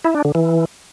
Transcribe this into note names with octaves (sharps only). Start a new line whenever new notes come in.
E4
D4
D3
E3